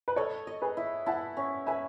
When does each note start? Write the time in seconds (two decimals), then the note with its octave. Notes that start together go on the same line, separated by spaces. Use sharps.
0.08 B4
0.16 A4 C#5 D#5
0.47 D#5
0.62 G#4 B4
0.77 E4
1.06 E4 F#5 A5
1.37 C#4
1.66 B4 E5 G#5